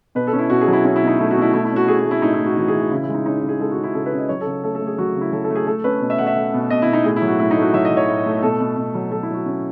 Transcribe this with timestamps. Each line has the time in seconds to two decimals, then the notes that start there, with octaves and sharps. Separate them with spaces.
0.15 B2 B4
0.27 A4
0.33 C#4
0.39 E4
0.50 B2 F#4
0.62 G#4
0.68 F#3
0.73 E4
0.85 C#4 E4
0.96 E4
1.02 B2
1.07 D#4
1.19 A3 E4
1.31 F#4
1.36 B2
1.42 E4
1.53 A3 E4
1.65 E4
1.71 C#4
1.76 F#4
1.88 A3 G#4
1.99 F#4
2.05 A3
2.11 E4
2.22 A2 D#4
2.34 E4
2.40 A2
2.46 F#4
2.57 E3 F#4
2.68 G#4
2.74 E3
2.80 F#4
2.91 C#3 E4
3.03 E4
3.09 G#3
3.14 D#4
3.26 C#4 D#4
3.37 E4
3.43 C#3
3.49 G#4
3.60 G#3 A4
3.72 F#4
3.77 C#3
3.83 E4
3.94 C#3 A4
4.06 B4
4.12 C#4
4.18 D#5
4.29 F#3 C#5
4.41 A4
4.46 C#3
4.63 A3 A4
4.75 A4
4.81 A3
4.87 G#4
4.98 F#3 F#4
5.15 C#3
5.21 E4
5.32 F#3 A4
5.44 A4
5.50 A3
5.55 G#4
5.67 A3 A4
5.84 C#4 B4
6.01 B2
6.10 E5
6.18 A3 F#5
6.27 E5
6.36 A3
6.54 B2
6.70 B2 D#5
6.82 E4
6.87 B2
6.93 D#4
7.04 A2 G#4
7.16 E4
7.22 F#3
7.27 F#4
7.39 A2 E4
7.51 D#4
7.57 A3
7.62 F#4
7.74 F#3 E5
7.85 D#5
7.91 F#3
7.97 C#5
8.08 A2
8.25 A3
8.43 B2 A4
8.60 B2
8.77 B2
8.95 F#3
9.11 F#3 A4
9.23 E4
9.29 F#3
9.34 F#4
9.46 C#4